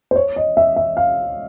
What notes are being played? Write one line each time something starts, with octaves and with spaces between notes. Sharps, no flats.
C5
C#5
D#5
E5
E5
F5